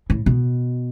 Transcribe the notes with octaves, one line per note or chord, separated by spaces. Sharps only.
A2
B2